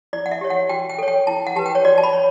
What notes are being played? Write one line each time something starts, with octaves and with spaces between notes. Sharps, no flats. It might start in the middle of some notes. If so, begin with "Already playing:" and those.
E4 D5
F#5
E5
G4 C#5
F#5
F#4 G5
G5
A4 C#5
G5
E4 A5
F#5
G4 B4 A5
G5
C#5
F#4 D5
A5
B5
C#5